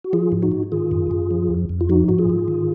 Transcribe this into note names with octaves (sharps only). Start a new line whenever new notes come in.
F#4
F3 F4 G#4
G#2
D#4 F#4
G#2
D#3 F4 G#4
F#2
F#2
F3
F2
F2
F4
F3 D#4 F#4
G#2 F#4
F4 G#4
G#2
D#3